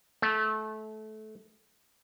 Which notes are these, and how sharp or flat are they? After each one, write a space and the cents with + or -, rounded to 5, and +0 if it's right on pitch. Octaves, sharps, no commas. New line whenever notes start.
A3 -20